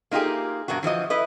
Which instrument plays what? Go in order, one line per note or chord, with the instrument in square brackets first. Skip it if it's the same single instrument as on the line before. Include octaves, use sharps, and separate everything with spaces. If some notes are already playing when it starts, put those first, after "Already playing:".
[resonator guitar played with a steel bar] A#3 D#4 F4 G4 G#4
G2 B2 A#3 F#4
E3 F3 F#4 D#5
E4 B4 D#5